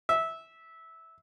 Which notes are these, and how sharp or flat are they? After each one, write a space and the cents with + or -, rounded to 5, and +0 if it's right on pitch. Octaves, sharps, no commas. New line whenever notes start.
E5 -15